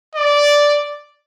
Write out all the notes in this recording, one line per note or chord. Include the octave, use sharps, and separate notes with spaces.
D5